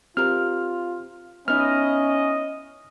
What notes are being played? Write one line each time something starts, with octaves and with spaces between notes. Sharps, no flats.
C4 F4 G4 A#4 F6
B3 C#4 D#4 E4 D#5 F6